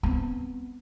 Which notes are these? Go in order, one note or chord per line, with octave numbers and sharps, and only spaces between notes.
B3 C4